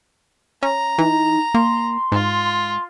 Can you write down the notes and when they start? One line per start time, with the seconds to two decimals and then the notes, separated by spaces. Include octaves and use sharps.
0.63 C#4 A#5
0.98 E3 D#4
1.55 A#3 C6
2.12 G#2 F4